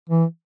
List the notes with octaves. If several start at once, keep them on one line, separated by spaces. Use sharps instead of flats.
E3